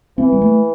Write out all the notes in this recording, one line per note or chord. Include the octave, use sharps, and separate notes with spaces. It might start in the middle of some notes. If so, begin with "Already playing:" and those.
E3 C4
G3
A3